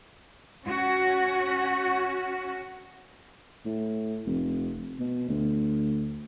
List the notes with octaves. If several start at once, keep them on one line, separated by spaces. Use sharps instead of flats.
C#4 F#4
A2
F1
B2
D2